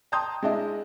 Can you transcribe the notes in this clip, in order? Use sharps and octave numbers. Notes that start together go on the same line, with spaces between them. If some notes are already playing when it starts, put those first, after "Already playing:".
G5 A5 A#5 C6 D#6 G6
G#3 D4 E4 D#5